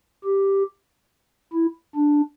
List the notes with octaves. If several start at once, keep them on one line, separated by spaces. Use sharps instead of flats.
G4
E4
D4